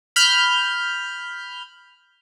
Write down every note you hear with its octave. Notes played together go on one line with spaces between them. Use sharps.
B5 F6 G6